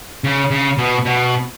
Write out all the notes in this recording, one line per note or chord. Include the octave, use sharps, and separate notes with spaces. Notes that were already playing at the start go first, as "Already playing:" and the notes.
C#3
C#3
B2
B2